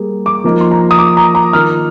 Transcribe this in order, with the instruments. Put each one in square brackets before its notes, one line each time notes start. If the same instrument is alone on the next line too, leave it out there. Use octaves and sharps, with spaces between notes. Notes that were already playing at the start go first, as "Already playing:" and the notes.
Already playing: [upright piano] G3 A#3 G#4
[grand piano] D6
[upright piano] F3 A#3 D#4
[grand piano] C6
A#5
D#6
D6
A#5
A#5
[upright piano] D#3 A#3 F4 A#4 [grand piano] F6